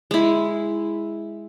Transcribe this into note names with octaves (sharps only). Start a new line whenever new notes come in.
G#3 E4